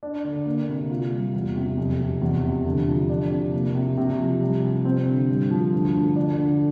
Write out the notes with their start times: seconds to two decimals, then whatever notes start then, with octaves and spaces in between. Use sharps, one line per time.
0.03 D4
0.24 D3
0.46 A#3
0.69 C3
0.90 F4
1.12 G3
1.34 E2
1.56 C3
1.78 F2
2.00 C3
2.22 E2
2.43 C3
2.65 D3
2.87 F3
3.10 D4
3.31 C3
3.53 A#3
3.75 C3
3.97 C3
4.20 F3
4.41 G3
4.63 C3
4.85 C4
5.06 D3
5.28 G2
5.51 F3
5.73 D2
5.94 D3
6.16 D4
6.38 D3